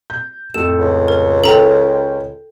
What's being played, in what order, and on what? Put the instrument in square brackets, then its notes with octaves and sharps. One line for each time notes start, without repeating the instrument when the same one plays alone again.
[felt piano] G6
[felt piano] F2 A2 A4 [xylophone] E7
[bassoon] C#2
[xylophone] A#4
[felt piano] C#4 G5 [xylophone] A4 A#5